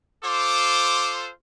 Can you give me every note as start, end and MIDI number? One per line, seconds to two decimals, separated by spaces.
0.24 1.30 65
0.24 1.30 69
0.24 1.30 72
0.24 1.17 86